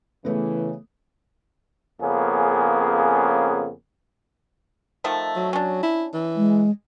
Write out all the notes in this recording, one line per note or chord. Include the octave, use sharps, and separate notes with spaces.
C#3 E3 A3 B3
F2 C#3 A#3 B3 C#4 G#4
D#3 F3 A3
F#3
C#4 D4
E4
E3
G#3